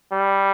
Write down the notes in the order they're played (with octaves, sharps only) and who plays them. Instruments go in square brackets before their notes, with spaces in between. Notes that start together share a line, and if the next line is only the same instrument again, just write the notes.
[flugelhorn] G3